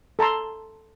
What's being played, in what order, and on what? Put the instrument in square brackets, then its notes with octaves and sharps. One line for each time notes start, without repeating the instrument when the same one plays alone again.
[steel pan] A4 A5 A#5 C6